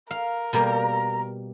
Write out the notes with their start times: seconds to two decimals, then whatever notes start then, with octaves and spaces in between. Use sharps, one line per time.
0.11 A#4 F5
0.53 B2 G3 A#3 A#5